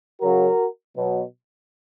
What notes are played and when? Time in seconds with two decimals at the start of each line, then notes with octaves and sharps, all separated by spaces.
0.21 C#3 F#3 F#4 A#4
0.96 B2 F#3